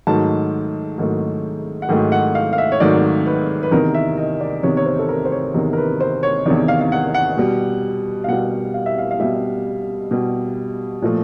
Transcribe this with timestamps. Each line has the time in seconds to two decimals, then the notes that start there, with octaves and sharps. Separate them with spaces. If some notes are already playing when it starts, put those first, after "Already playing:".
0.07 G#2 D#3 F#3 A3 A5
0.98 G#2 D#3 F#3 A3
1.82 F#5
1.89 G#2 D#3 F#3 A3 G5
2.12 F#5
2.35 F5
2.53 F5
2.58 E5
2.72 C#5
2.80 G#2 D#3 F#3 A3 D5
3.26 B4
3.63 B4
3.71 E2 C3 D#3 A#4
3.94 E5
4.18 D#5
4.41 D5
4.63 E2 C3 D#3 C#5
4.77 C#5
4.86 C5
4.99 A4
5.09 A#4
5.25 C5
5.32 C#5
5.54 E2 C3 D#3 A#4
5.73 A#4
5.77 B4
6.00 C5
6.23 C#5
6.46 E2 C3 D#3 D5
6.68 F5
6.81 F5
6.92 F#5
7.15 F#5
7.37 B2 G3
8.24 F5
8.28 B2 G3 F#5
8.74 F5
8.86 E5
8.98 F5
9.11 F5
9.20 B2 G3 E5
10.11 B2 G3
11.02 A#2 F3 A3